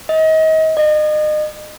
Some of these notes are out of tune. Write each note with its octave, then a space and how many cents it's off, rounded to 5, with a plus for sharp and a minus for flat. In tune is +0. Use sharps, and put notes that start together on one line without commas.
D#5 +30
D#5 -35